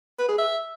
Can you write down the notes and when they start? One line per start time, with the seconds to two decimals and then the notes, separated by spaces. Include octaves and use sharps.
0.19 B4
0.28 G#4
0.38 E5